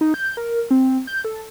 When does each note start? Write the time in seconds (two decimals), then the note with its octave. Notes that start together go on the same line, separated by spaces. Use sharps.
0.01 D#4
0.14 G6
0.37 A#4
0.71 C4
1.07 G6
1.25 A4